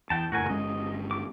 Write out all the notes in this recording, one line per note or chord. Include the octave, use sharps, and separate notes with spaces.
E2 G5 A5
F#1 A2 F#4 A#4 G#5
G1 G#3 C#4 D#5
D6